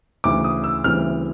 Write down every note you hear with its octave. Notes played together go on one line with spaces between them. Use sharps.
D2 C#3 E3 D6
D#6
E6
D2 C#3 E3 G3 C4 F6